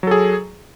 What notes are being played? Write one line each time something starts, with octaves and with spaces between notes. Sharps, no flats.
F#3 G#4 A4